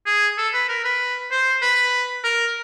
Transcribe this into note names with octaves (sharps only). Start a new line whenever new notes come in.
G#4
A4
B4
A#4
B4
C5
B4
A#4